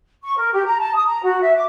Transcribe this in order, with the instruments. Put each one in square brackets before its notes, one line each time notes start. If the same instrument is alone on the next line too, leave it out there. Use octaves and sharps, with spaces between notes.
[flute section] C#6
A#4
G4
A#5
A5
D#6
A#5
F#4
E5
D6